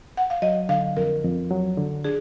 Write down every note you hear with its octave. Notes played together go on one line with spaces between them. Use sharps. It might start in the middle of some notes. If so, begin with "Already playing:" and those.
F#5
F5
F#3 D#5
D3 F5
F2 A#4
F2
F#3
D3
D4 G#4